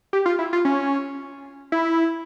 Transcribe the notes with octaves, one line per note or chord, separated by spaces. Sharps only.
G4
F4
E4
F4
C#4
E4